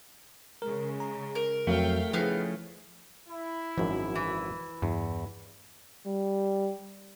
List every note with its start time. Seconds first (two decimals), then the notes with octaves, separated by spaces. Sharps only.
0.62 C#3 G#3 A#4
1.00 A#5
1.35 A#4
1.67 F2 F#3 A3 F5 G5
2.13 C#3 F3 B3 D#4 E4 F5
3.29 E4
3.78 G#1 F#2 F3
4.15 E3
4.82 E2 G2
6.06 G3